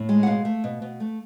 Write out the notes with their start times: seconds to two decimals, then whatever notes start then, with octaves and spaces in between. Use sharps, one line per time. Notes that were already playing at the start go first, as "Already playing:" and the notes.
Already playing: A2
0.09 G#3
0.23 F#5
0.27 B2 F5
0.45 A3
0.64 B2
0.82 B2
1.00 A3